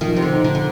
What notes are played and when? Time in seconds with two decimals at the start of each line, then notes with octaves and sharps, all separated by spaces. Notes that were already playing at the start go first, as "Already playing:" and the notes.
0.01 D#3 F3
0.17 C3
0.22 D3
0.33 D#4
0.44 D3
0.55 D3